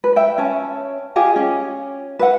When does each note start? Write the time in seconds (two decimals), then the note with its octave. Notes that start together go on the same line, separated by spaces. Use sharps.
0.04 B4
0.16 E5 G5
0.38 C#4 C#5 A5
1.16 F4 G4 G#4 D#5
1.36 C#4
2.19 B4 E5 F#5